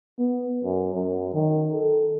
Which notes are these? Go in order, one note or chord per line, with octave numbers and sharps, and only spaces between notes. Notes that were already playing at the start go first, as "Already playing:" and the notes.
B3
F#2
F#2
D#3
A4